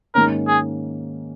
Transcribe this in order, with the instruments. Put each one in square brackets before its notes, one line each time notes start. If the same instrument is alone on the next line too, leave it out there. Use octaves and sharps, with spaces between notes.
[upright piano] G#2 D#3 A#3 C#4 [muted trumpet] A#4
[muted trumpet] G#4